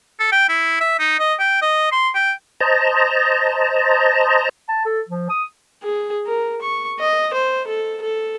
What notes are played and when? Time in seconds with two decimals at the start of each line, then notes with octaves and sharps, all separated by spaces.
0.20 A4
0.32 G5
0.49 E4
0.80 E5
0.99 D#4
1.19 D#5
1.39 G5
1.62 D#5
1.92 C6
2.15 G5
2.60 C5 D#5 A5 A#5
4.69 A5
4.85 A4
5.09 F3
5.30 D#6
5.82 G#4
6.26 A#4
6.62 C#6
7.00 D#5
7.33 C5
7.67 A4
8.02 A4